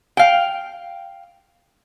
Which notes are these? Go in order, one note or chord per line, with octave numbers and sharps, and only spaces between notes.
F5 G5